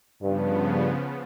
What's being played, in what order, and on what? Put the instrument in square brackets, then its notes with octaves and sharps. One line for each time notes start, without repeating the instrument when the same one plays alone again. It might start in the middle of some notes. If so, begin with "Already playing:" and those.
[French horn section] G2 [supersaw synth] C#3 F3 B3